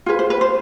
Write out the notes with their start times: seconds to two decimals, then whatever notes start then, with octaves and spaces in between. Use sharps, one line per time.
0.06 F4 G#4 B4
0.19 C5
0.30 B4
0.41 C5